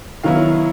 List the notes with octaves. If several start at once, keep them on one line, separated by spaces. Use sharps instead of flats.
D#3 F#3 B3 E4 F5